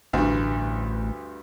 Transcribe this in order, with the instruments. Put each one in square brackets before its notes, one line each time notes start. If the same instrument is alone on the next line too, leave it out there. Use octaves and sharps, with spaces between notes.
[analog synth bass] A1 [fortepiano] D2 G2